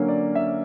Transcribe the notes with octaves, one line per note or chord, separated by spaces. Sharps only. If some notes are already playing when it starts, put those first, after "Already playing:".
Already playing: D3 F#3 A#3 C#4
D5
E5